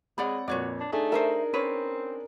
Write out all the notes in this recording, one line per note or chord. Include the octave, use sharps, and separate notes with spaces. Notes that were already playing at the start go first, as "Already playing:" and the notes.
G#3 C4 C#5 D5 F#5 B5
F2 A#2 F#4 B4 C#5 D5
D4
A3 D4 D#4 G#4
A#4 C5 D#5 E5
C4 C#4 B4 C#5